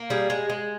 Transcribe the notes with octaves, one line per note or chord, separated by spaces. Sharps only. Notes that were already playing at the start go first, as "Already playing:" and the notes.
Already playing: A#3
G3 G#4
G#3
G#3